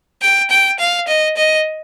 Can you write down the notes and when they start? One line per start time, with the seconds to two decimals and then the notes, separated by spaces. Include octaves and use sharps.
0.22 G5
0.51 G5
0.79 F5
1.08 D#5
1.37 D#5